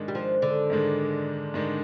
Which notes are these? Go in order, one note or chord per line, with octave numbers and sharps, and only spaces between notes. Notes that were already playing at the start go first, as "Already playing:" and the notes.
Already playing: G#2 D#3 G#3 D4
G3
F3
D3
G#2 D#3 G#3 D4
G#2 D#3 G#3 D4